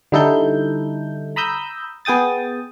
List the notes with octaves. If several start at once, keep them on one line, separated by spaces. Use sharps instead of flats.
D3 G3 D#4 E4 A4 G6
A#5 B5 D#6 E6 G6
B3 G#4 G5 D#6 A6